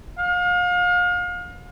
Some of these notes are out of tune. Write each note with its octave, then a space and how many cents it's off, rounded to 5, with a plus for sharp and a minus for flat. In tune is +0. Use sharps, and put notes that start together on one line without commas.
F5 +35